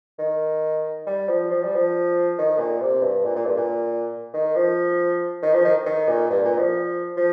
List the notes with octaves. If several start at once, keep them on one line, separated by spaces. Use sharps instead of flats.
D#3
G3
F3
F3
G3
F3
D#3
A#2
C3
G2
A#2
A#2
G2
A#2
D#3
F3
D#3
F3
D#3
D#3
A#2
G2
A#2
F3
F3